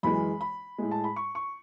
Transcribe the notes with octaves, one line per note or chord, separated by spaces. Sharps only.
F#2 E3 G#3 B5
B5
A2 G#3
A5
B5
C#6
C#6